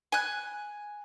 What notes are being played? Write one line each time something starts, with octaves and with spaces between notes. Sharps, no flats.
G#5 F#6